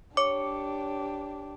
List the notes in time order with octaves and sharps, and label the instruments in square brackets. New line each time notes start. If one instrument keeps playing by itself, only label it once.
[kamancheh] D4 G4 [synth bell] C#5 [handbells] D6